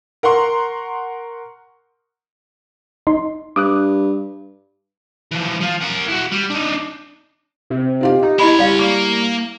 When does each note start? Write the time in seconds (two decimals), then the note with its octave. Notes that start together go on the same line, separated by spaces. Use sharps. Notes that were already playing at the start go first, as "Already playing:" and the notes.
0.23 A#4 F#5 A#5 C6 C#6
3.07 D#4 C6
3.56 G2 D6 D#6 F#6
5.32 E3 F3
5.60 F3 F4
5.81 A#4 F#5
6.08 E4 F#4
6.31 G3
6.50 D4 D#4
7.70 C3
8.01 D#4 F4 G4
8.23 D#4 G4
8.39 G#3 E4 C#5 D#5 B5 C#6
8.59 G3 D5 F5
8.79 A#3